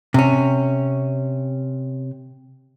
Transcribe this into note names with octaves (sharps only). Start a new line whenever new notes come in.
C3 C#4